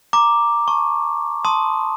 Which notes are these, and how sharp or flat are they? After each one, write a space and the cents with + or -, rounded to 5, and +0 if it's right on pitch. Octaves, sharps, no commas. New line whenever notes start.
A#5 +0 D6 +0
A5 +0 C#6 -10
A5 +0 C6 +0 D#6 +0